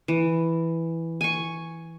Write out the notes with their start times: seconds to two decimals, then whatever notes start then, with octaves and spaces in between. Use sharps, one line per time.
0.08 E3
1.21 G#5 C#6